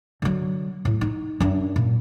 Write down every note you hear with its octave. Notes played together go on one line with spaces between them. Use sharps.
D3 F#3
A2
D#4
F#2 D4
A#2